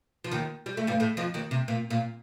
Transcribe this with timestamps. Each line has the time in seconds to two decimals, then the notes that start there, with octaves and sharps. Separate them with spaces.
0.24 F3
0.31 D#2 D#3
0.66 G3
0.77 A3
0.87 G2 G3
1.00 A2 A3
1.17 F2 F3
1.34 D#2 D#3
1.51 C3
1.68 A#2
1.90 A#2